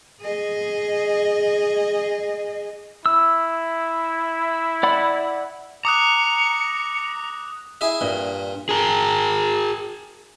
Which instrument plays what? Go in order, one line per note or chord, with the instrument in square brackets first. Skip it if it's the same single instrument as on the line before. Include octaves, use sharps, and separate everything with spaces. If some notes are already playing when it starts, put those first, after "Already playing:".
[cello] G#4 D#5
[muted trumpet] E4 [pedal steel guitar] E6
[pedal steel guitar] D5 F#5 B5
[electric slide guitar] A#5 [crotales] D6 D#6 F#6 [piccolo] C#7
[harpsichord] E4 G#4 E5
G2 A#2
[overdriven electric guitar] G#4 A#4